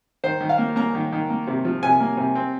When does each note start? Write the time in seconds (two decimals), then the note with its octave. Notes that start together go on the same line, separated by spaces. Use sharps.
0.24 D#3 C5
0.41 D#3
0.49 F5
0.58 A#3
0.76 A#3 A#5
0.95 D#3
1.12 D#3
1.30 A#3
1.47 C3
1.65 F3
1.83 C3 G#5
2.00 A#3
2.17 C3
2.35 C4